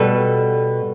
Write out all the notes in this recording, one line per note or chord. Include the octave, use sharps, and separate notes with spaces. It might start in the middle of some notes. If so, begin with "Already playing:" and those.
Already playing: B2 G3 A4 B4